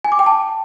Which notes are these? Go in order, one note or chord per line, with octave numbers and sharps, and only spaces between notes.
G#5
D6
G5
A5